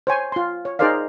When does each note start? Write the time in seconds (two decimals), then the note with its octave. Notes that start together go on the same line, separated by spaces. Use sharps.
0.07 C5 C#5 G#5
0.32 F4 C6
0.65 C#5
0.79 D#4 G#4 A#4 C5 D5 F5